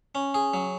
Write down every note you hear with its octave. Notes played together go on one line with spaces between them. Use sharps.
C#4
G#4
F#3